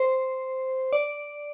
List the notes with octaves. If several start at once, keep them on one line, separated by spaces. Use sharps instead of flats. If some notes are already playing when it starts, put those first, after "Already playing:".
Already playing: C5
D5